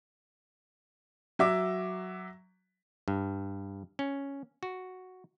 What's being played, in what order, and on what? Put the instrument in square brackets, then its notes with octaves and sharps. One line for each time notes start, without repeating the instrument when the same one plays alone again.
[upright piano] F#3 E5 D6
[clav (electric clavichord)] G2
C#4
F#4